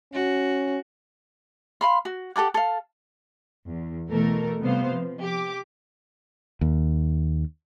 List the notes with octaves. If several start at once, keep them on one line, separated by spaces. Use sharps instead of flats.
C#4 F#4
F5 B5 C6
F#4
G4 A4 F#5 D6
A4 F5
E2
B2 E3 A3 A4 A#4
C3 G3 B3 C5 F5
F3
G4 D6
D#2